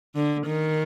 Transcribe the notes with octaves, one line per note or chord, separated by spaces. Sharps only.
D3
D#3